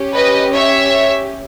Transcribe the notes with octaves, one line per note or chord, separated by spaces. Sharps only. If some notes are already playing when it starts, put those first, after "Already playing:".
Already playing: C#4 G4
B4 D#5
C#5 E5